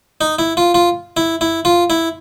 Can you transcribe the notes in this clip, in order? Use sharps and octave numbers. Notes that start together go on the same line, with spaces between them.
D#4
E4
F4
F4
E4
E4
F4
E4